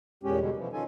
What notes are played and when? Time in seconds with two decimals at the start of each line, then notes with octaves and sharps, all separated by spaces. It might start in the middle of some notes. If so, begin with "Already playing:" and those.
0.23 E2 A#2 G#3 C#4 G4
0.40 B2 D3 G3 G#3
0.56 B2 E3 F3
0.73 D#3 C#4 D#4 F4 A4 G#5